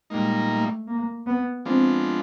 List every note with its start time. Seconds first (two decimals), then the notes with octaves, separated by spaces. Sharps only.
0.10 A#2 G3 G#3 A#3 D#4
0.49 A3
0.87 A#3
1.26 B3
1.65 F3 G#3 B3 C4 D4 F4